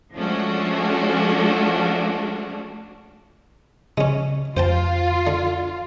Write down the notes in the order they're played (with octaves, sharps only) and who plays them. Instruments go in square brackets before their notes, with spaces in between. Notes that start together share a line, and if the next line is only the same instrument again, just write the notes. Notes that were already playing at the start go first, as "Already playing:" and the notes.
[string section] F3 G#3 A3 C#4 D4 F#4
[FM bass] C#3 [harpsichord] G#3 C#4
[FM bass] F2 [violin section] F4 [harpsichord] C5 G5 A5
[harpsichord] D3